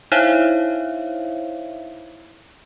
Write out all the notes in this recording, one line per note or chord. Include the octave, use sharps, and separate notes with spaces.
D#4 E4 C5 C#5 E5 F5